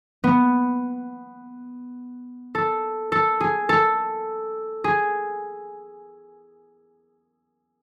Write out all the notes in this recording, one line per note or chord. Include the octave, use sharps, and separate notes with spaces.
B3
A4
A4
G#4
A4
G#4